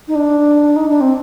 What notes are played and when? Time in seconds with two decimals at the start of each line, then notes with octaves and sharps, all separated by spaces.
0.08 D#4
0.15 D4
0.76 D#4
0.89 D4
1.01 C4